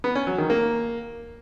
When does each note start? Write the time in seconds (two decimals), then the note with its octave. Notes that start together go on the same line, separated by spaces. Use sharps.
0.04 B3
0.15 C#4
0.27 F#3
0.38 D#3
0.50 A#3